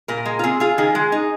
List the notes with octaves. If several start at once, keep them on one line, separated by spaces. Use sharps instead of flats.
A#2 A#4
G#3
F4
C4 G#4
F4 G#4
D#3 G#4
G#3
D#4